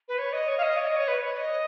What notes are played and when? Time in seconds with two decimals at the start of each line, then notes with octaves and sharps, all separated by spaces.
0.08 B4
0.18 C#5
0.33 D#5
0.48 C#5
0.58 F5
0.63 D#5
0.77 C#5
0.87 D#5
0.96 C#5
1.08 B4
1.22 C#5
1.37 D#5